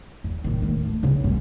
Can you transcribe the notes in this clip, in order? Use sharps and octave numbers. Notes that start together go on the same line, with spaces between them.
E2
A2 D#3
D#2 A3
F3
C#3 B3
C#2 F#2